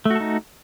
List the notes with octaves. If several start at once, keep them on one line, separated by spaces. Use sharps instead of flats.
A3 D#4 F#4 A4